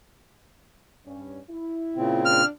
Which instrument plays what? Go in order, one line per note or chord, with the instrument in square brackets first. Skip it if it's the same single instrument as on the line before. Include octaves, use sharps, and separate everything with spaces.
[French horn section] G2 C#4
E4
[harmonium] A#2 C#3 C4
[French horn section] D4 [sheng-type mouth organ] F6